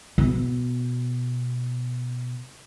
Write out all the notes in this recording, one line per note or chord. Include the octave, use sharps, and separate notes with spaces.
B2 B3